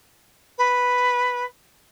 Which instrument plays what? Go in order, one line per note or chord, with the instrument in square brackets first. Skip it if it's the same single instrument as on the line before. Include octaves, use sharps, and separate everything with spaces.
[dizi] B4